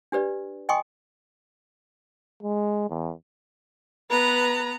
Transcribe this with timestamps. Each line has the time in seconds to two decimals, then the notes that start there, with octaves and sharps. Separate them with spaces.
0.12 D4 G4 B4 D5
0.69 D#5 G5 G#5 C6 C#6 D#6
2.43 G#3
2.90 E2
4.10 B3 B4 A#5